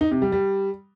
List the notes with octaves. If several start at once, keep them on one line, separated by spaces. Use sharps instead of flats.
D#4
C3
G3
G3